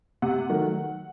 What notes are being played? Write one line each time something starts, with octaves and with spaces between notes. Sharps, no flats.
C3 F#5
D#3 F#3 A3